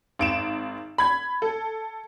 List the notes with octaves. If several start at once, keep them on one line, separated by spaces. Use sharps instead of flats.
G#1 D7 E7
B5 G#6
A4